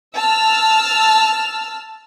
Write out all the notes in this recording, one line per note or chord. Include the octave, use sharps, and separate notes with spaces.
A5 E6 F6